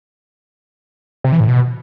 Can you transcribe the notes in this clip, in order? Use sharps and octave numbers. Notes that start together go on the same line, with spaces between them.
C3
E3
A2
B2